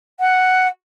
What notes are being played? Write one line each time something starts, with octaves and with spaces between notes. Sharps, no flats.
F#5